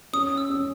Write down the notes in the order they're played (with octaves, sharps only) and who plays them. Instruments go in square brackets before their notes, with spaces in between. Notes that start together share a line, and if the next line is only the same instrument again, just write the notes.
[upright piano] C#4 [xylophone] D#6
[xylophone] E6
[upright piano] C#4